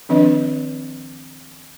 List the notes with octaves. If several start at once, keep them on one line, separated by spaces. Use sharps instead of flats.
D#3 F3 C4 D4 B4 D#5